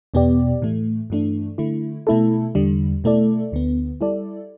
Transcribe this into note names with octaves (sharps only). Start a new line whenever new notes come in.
E2 B2 B3 G4 D5
A2 E3 A3
G2 E3 A3 D4
D3 A3 E4
B2 A3 E4 A4
E2 D3 G3
B2 A3 E4 A4 D5
D2 D3 B3
G3 E4 A4 D5